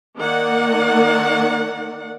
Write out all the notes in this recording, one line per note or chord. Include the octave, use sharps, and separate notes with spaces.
D#3 A#3 D5 F#5